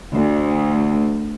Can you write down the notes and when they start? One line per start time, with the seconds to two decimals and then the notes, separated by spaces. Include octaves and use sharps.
0.14 D2